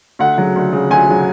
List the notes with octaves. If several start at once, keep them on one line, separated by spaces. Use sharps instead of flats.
D2 F#5
C#3 F#3
D2
C#3 F#3
D2 G#5
C#3 F#3